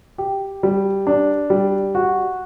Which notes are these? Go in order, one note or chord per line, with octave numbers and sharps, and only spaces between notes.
G4
G3
D4
G3
F#4